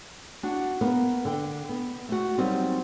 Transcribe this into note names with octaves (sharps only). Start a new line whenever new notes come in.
D4 F#4
A#3 B3 A#4 B4
D3 G5
B3
A3 F#4
F#3 G3 A#3 C4 D#4